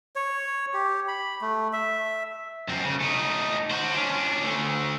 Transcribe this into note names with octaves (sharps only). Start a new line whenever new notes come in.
C#5
G4
B5
A3
E5
F#2 C4
C#3
A3 D#4
F#4 C5
C#4 D4
D2 A3